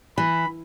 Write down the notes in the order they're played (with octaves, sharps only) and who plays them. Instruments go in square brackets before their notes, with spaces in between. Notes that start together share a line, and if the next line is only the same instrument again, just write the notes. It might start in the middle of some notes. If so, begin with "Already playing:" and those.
[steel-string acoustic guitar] E3 [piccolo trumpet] B5